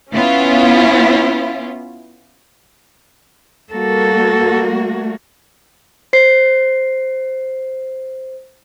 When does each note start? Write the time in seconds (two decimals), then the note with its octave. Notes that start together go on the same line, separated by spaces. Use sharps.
0.13 B3 C#4 E4 F4
3.73 G3 A#3 F#4 A4
4.68 A3
6.13 C5 C7